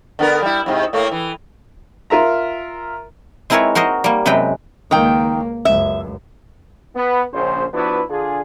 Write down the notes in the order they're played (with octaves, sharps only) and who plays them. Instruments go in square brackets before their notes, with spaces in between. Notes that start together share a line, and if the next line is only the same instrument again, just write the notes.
[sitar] D3 B3 A#4
G3 E4
E2 G#2 C3
A2 A3 A#3
E3
[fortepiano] F4 A#4 E5 A#5
[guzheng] G#3 C4 E4 A#4 B4 C#5
F#4 A#4 C5 D#5
G3 A#3
F#2 C3 G#3 B4 G5
[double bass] C#2 A#3 [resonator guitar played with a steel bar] D#3 G5
[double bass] C#2 F#2 [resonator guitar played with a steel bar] E5
[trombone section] B3
A#1 C#3 C5
F3 B3 D4 E4 F#4 B4
D3 D4 F4 G#4